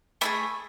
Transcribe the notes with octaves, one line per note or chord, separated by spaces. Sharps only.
A3 D4 G#4 B5